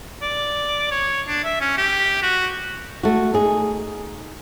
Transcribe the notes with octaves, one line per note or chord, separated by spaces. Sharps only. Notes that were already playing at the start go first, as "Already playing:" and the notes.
D5
C#5
D4
E5
C#4
G4
F#4
A3 F#4
D#4 G#4